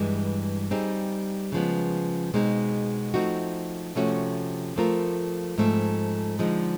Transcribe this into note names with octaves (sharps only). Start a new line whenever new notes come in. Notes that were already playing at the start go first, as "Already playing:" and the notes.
Already playing: G2 E3 G#3
G3 C4 D#4 G#4
C#3 F3 G#3 B3
B2 G#3 C4 D#4 G#4
F3 A3 C4 D#4 F#4
C3 F3 A3 C#4 F#4
F3 A3 C4 F4 A#4
G#2 F3 A3 C4
D3 F3 G#3 C4 D#4